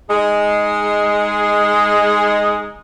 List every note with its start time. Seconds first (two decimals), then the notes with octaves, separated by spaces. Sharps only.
0.10 G#3 D#4 G#4